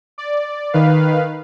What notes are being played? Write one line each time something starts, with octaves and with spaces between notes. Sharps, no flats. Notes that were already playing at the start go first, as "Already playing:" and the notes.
D5
D#3 B4 F5